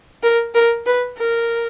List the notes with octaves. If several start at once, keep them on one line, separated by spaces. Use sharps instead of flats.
A#4
A#4
B4
A#4